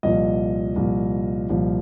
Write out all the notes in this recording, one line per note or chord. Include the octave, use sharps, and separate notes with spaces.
C2 A#2 F3 D#5
C2 A#2 F3
C2 A#2 F3